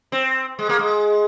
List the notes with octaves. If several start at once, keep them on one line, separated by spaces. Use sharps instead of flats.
C4
G#3
A#3
G#3